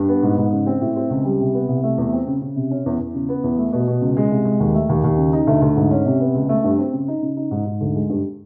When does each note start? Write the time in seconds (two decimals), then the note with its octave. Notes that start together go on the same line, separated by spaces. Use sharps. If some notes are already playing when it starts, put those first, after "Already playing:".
Already playing: G2
0.09 B3
0.23 G#2
0.38 G#2
0.52 C#3
0.67 C4
0.81 A2
0.96 C4
1.10 C#2
1.25 G3
1.40 C3
1.54 B3
1.69 C2
1.83 A3
1.98 E2
2.13 C4
2.27 C#3
2.42 C#3
2.56 C3
2.71 C#4
2.86 E2
2.99 E2
3.14 C#3
3.29 B3
3.44 E2
3.58 A3
3.73 B2
3.87 B2
4.01 C#2
4.17 G#3
4.31 C2
4.45 G#3
4.60 D#2
4.75 A3
4.89 D#2
5.04 D#2
5.18 C#3
5.33 D#4
5.47 D2
5.62 D2
5.76 G#2
5.91 C#4
6.05 C3
6.20 B3
6.34 C#2
6.49 A3
6.64 G2
6.79 C4
6.93 C#3
7.08 D#4
7.22 C#3
7.37 D#4
7.51 G#2
7.66 G#2
7.80 D2
7.95 G#3
8.09 G2